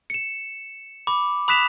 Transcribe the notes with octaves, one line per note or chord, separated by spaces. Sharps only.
C#7 E7
B5 D6
B5 D#6 F#6 B6 E7 F7